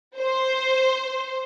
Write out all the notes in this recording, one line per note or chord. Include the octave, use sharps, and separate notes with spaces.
C5